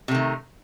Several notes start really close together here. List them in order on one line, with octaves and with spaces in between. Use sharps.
C3 A3 D#3